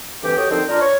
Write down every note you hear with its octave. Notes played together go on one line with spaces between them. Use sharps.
D2 G2 E3 C4 G4
F#4 G4 A4 C#5 D#5 G5
D3 D#3 F3 C4
D4 F4 A#4
C#5